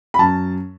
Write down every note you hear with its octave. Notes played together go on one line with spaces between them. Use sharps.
B5
F#2 A5